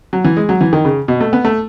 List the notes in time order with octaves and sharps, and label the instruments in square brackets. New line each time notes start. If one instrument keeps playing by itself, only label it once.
[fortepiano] F#3
E3
G#3
F#3
E3
D#3
C#3
B2
A3
B3
A3